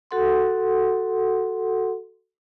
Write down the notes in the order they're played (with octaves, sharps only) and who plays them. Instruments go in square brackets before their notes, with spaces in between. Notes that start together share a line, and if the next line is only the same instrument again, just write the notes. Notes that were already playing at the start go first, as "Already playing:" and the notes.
[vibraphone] F#4 A4 F#5 C6